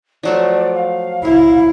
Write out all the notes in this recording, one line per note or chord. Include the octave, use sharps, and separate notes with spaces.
F3 F#3 A3 D5
F5
E4 A#4